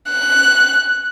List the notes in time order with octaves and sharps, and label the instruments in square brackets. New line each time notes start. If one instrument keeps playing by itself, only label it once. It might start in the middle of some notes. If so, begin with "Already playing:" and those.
[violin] F#6